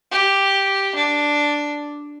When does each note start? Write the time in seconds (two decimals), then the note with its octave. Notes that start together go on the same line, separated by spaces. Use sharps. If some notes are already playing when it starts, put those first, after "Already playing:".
0.11 G4
0.95 D4